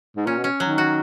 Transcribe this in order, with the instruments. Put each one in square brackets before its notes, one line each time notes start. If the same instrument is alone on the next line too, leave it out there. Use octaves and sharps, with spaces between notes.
[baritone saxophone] G#2
[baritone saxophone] A#2 [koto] C#4
[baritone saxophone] B2
[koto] C#4
[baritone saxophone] D#3 [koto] F#3
[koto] F#4